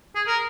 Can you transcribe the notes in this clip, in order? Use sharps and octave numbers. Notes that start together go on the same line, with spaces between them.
G#4
A#4